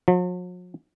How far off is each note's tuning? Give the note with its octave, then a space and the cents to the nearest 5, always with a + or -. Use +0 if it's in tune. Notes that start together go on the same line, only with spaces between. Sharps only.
F#3 -45